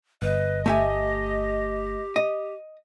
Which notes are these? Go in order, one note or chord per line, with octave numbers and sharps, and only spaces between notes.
G1 B4 D#5
A3 G4 E5 G#5
D#5